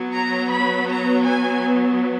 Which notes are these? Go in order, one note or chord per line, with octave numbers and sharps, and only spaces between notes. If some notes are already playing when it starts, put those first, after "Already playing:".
Already playing: F#3 B3
A#5
B5
A#5
G#5